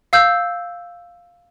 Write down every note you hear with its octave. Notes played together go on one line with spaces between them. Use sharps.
F5 E6 G6